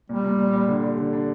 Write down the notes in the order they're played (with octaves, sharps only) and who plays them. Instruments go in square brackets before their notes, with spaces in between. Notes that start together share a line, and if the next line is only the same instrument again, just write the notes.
[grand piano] A#2 [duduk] G3
[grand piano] A#2
A#2
A#2
D3
G3
D3
D4